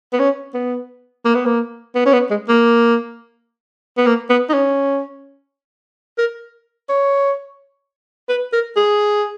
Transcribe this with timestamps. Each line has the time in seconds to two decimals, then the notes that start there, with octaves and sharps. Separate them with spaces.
0.13 B3
0.19 C#4
0.54 B3
1.25 A#3
1.35 B3
1.45 A#3
1.95 B3
2.06 C#4
2.13 B3
2.30 G#3
2.48 A#3
3.97 B3
4.07 A#3
4.30 B3
4.49 D#4
4.54 C#4
6.18 A#4
6.89 C#5
8.29 B4
8.53 A#4
8.76 G#4